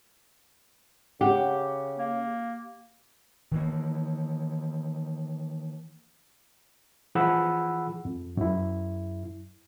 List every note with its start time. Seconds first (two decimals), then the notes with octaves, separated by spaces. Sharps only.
1.21 C#3 G4 F#5
1.98 A#3
3.51 D#3 E3 A#3
7.15 E3 F3 G#4 F#5 B5 E6
8.05 F2
8.37 F#2 E4